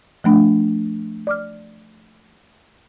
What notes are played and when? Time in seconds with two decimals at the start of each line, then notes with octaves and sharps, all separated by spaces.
0.24 F3 A3 D4
1.27 D5 D6 F6